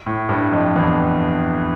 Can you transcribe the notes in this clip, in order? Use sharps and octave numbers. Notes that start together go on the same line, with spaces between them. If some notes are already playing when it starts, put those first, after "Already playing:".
A2
G2
F2
E2